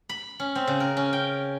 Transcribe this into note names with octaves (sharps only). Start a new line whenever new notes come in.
B5
C#4
C4
C#3
A#4
C#4
G5